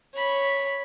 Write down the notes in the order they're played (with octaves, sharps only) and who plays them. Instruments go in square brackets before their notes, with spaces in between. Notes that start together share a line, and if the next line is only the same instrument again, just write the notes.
[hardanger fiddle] C#5 B5